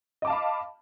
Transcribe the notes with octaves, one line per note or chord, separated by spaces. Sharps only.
D#5 F5 A5 B5 D6